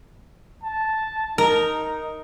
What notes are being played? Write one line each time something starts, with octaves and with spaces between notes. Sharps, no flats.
A5
D#4 A#4